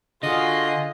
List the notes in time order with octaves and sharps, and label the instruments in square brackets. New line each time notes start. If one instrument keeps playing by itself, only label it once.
[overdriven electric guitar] D3 [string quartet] F4 [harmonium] F#4 G#4 [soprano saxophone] D#5